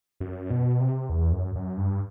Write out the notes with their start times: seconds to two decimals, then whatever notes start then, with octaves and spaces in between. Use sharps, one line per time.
0.20 F#2
0.50 B2
0.80 C3
1.10 E2
1.32 F#2
1.55 F#2
1.77 G2